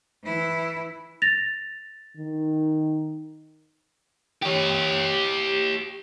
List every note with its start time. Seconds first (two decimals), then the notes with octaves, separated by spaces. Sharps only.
0.24 E3 E4
1.22 A6 A#6 F7
2.17 D#3
4.43 G4 C#5